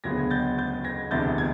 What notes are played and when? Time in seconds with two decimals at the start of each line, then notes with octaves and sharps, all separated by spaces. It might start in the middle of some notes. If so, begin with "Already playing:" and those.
0.04 E1 D2 C#3 F#3 B3 G#6 A#6
0.30 G6 A6
0.58 G6 A6
0.84 G#6 A#6
1.11 E1 D2 C3 E3 G6 A6
1.38 G#6